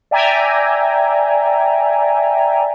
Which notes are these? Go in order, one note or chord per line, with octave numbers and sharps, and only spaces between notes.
D5 E5 G5 G#5 A#5